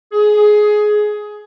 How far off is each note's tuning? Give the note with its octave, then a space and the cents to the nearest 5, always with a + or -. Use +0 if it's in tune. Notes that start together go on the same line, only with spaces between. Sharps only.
G#4 +15